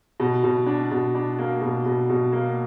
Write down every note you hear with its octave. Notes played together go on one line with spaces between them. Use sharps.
B2
B2
D4
B2
D4
A#3
B2
B2
B2
A#3